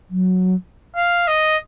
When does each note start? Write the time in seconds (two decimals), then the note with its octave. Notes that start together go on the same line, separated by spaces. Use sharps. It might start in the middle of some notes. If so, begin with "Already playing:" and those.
0.10 F#3
0.96 F5
1.27 D#5